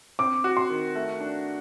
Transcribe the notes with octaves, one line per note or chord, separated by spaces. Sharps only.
C4 D6
F#4
C6
D#3
A3
D4